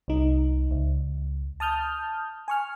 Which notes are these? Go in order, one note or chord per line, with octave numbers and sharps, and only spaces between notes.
C2 D#4
C#2
A5 D#6 F6 G6
G#5 C#6 F6